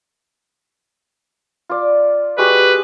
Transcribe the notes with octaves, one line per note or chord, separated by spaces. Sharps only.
F4 D5
G#3 F#4 G4 B4